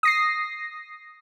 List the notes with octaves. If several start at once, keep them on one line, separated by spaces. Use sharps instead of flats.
D#6 A#6 C7